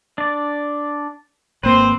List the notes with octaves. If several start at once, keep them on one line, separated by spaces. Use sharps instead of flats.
D4 D5
G#1 A#3 C4 B4 C5